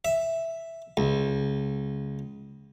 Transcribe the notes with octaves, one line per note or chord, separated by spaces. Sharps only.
E5
C#2